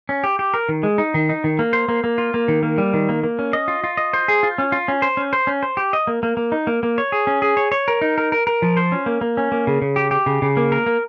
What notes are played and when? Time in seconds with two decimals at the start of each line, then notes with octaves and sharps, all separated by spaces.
0.09 C#4
0.24 G4
0.39 G4
0.54 A#4
0.69 D#3
0.83 G#3
0.98 D#4
1.14 D#3
1.29 D#4
1.44 D#3
1.59 A#3
1.73 C5
1.88 A#3
2.04 A#3
2.18 F4
2.34 A#3
2.48 D#3
2.63 A#3
2.78 G3
2.94 D#3
3.09 A#3
3.23 A#3
3.39 C#4
3.53 D#5
3.68 F4
3.84 F4
3.97 D#5
4.13 C5
4.28 G#4
4.43 F4
4.58 C#4
4.72 F4
4.88 C#4
5.02 C5
5.17 C#4
5.33 C5
5.47 C#4
5.63 C5
5.77 G4
5.93 D#5
6.07 A#3
6.23 A#3
6.37 A#3
6.52 D#4
6.67 A#3
6.83 A#3
6.98 C#5
7.12 G#4
7.27 C#4
7.42 G#4
7.57 C#5
7.72 C#5
7.88 A#4
8.01 D#4
8.18 A#4
8.32 A#4
8.47 A#4
8.62 F3
8.77 C5
8.92 C#4
9.06 A#3
9.21 A#3
9.37 C#4
9.52 A#3
9.67 C#3
9.82 C#3
9.96 G4
10.11 G4
10.26 C#3
10.42 C#3
10.57 A#3
10.72 A#4
10.86 A#3